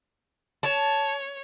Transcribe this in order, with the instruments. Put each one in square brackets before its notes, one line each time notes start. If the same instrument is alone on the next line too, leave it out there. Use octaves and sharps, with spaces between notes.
[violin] C#5 [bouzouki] A5